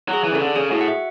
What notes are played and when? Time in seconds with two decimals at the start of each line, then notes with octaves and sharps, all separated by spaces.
0.09 F#3 G#4
0.24 E3
0.32 C#3
0.35 D3 A4
0.56 C#3 G#4
0.71 A2 F#4
0.81 F#5
0.88 E5